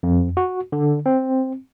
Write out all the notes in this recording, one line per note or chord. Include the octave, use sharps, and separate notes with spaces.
F2
F#4
D3
C4